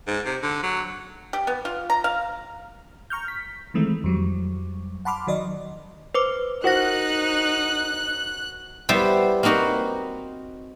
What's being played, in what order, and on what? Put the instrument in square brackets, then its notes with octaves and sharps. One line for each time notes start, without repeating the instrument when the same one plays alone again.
[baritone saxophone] G#2
C3
D3
F#3
[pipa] G4
B3
F4
A#5
F5
[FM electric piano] A#5 C#6 F6 G6
B6
D#3 E3 G#3 A3 C4
F2 F#3 G3
F#5 A5 B5 C6 D6 F6
D#3 F#3 D5 D#5 C6
[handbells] B4 C5 D6
[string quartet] D#4 [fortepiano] F#4 F#5 [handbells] A#4 C5 A#6 [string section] F#6
[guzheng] G3 B3 E4 C5
A#3 C4 D#4 F#4 B4